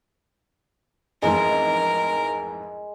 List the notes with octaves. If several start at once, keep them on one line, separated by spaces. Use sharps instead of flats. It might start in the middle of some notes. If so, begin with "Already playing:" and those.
A1 F2 G#2 G#3 A#4